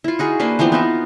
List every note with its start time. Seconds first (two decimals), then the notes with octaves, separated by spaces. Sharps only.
0.04 E4 F4
0.19 D#4 F#4 G#4
0.40 A#3 D4 B4 C5
0.59 E3 F3 B3 C4
0.72 B3 D#4 F4 E5